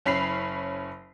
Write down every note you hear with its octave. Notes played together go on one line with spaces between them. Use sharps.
F#1 C#4 B5 B6 C7 F7